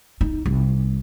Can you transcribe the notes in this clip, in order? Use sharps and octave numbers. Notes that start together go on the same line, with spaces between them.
D#4
C2